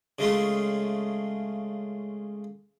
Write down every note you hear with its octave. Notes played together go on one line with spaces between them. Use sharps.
C#3 G#3 A3 F4